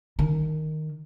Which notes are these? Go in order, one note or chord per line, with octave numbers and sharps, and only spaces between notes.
D#3